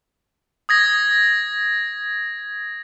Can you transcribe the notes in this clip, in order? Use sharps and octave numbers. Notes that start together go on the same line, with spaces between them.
D#6 G#6 A#6